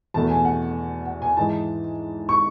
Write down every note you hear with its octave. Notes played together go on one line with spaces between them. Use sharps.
E2 B2 A3 A5
G#5
F#5
F#5
G#5
G#2 E3 G#3 A5
C#6